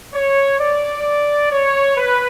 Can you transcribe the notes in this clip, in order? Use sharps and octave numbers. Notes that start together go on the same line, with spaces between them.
C#5
D5
C#5
B4